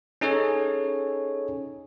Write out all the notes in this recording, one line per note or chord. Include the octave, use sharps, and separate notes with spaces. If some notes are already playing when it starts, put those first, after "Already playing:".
C#4 D#4 G#4 A4 C#5